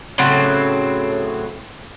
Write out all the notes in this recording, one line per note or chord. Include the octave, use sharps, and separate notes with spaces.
A2 C#3 F#3 C4